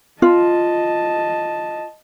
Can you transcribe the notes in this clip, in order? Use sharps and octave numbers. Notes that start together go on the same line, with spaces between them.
F4 D#5 A5